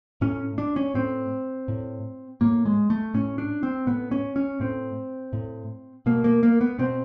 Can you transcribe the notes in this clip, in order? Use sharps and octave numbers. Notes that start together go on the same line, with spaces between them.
A2 C#4
D4
C#4
A2 C4
A2
A2 A#3
G#3
A3
A2 C#4
D4
C4
A2 B3
C#4
C#4
A2 C4
A2
B2 A#3
A#3
A#3
B3
B2 C4